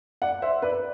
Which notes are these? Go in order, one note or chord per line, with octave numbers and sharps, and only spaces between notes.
D5 F#5
C5 E5
B4 D5